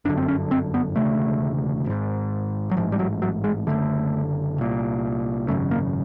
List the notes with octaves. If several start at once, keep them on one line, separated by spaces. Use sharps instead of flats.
G1 F#2 D3 D4
C4
C#4
C4
B3
E1 D2 C#3 A3
G#1 G#2
F#3
A1 G#2 F3
G3
F#3
F#3
G#3
F#1 F2 D3 A3
C2 A#2
G#1 F#2 C#3 A3
A#3